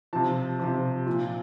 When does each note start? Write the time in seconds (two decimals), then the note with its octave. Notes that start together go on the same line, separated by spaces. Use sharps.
0.13 C3 F3 A5
0.60 C3 F3
1.06 A#2 F3